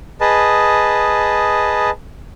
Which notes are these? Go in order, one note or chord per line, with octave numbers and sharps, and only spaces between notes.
G#4 B4 D#5 A5